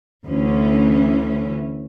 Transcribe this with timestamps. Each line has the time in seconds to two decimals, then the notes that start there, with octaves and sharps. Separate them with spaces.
0.25 D2 E3 C#4